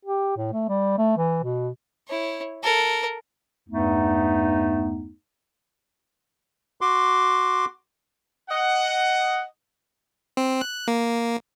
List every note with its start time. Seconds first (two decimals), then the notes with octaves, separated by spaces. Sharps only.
0.05 G4
0.37 A2
0.53 A3
0.69 G3
0.98 A3
1.17 E3
1.43 B2
2.08 E4 C#5
2.63 A4 A#4
3.69 E2 G2 A3 B3 D#4
6.81 F#4 C6 D6
8.50 D#5 F#5
10.37 C4
10.61 F#6
10.88 A#3